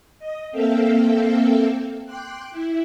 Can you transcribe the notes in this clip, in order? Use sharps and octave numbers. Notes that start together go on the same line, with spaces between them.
D#5
A#3 C4 A4 E5 F5 G5
G5 C6 D6 F#6
E4